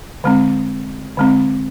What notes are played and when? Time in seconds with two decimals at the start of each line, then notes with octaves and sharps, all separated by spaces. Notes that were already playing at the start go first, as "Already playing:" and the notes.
0.24 D3 G#3 C4
1.17 D3 G#3 C4